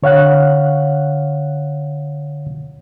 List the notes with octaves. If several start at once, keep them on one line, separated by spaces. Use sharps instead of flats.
D3 C#5 F5 F#5 F#6